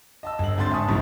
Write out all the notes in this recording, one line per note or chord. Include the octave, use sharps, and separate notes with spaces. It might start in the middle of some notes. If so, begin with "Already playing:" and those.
D#5 A5 E6
G1 F#7
G#1 D3 C4 C6 A6
E5 G#5 A5 C#6 D#6
F1 A#1 G2 B2 D#3 E3